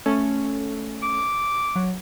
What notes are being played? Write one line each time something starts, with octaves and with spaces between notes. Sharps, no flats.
A3 C#4 A4
D6
F#3